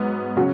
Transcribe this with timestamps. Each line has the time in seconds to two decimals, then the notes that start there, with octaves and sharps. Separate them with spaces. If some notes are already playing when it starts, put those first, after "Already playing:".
Already playing: G#2 F#3 B3
0.37 C#3 F#3 C#4 F#4